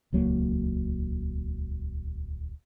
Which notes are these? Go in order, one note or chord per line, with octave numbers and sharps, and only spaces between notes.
D#1 C#2 F#3 A#3